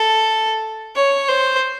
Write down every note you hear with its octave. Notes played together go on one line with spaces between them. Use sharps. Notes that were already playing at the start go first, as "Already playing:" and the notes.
Already playing: A4
C#5
C5